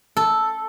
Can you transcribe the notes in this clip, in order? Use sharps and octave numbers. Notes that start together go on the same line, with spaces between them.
A4